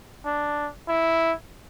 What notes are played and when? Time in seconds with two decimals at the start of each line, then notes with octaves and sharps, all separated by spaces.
0.25 D4
0.88 E4